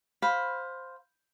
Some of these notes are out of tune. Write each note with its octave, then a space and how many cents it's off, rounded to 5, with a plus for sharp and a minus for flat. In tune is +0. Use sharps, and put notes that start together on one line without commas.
C5 +0 F5 +15 B5 -5